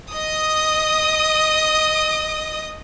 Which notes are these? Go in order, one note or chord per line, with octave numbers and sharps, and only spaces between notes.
D#5 D#6